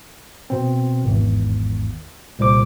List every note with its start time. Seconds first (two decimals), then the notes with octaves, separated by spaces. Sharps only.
0.50 B2 C4
1.04 G#1 E2
2.39 C2 A#2 C5 D6